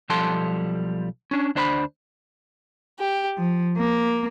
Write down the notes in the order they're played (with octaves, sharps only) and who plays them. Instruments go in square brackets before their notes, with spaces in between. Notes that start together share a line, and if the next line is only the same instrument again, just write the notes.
[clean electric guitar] B1 F3 G3 A4 A5 C6
C#4 D4
D2 D4 C5 A#5 B5
[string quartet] G4
F3
A#3